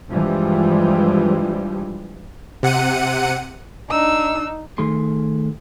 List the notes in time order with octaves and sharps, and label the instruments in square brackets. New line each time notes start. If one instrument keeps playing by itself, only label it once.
[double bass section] G2 E3 F3 G3 G#3
[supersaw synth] C3 F#5 C#7 D#7
[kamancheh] D4 E6 [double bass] D#4
[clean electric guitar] D#3 A3 G#4 C6